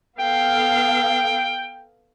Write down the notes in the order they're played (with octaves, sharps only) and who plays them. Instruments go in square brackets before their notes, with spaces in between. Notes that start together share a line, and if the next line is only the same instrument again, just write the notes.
[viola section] B3 A4 F5 [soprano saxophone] G5